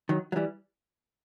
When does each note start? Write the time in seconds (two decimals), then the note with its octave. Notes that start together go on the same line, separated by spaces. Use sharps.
0.09 D#3 F#3
0.32 F#3
0.36 E3 G3